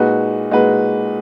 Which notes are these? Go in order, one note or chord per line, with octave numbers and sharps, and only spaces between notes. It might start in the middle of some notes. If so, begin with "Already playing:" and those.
Already playing: A#2 G#3 D#4 F#4 B4
A#2 G#3 D#4 F#4 B4